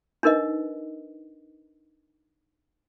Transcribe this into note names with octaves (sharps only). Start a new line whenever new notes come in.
D4 D#4 A#4 B4 D#5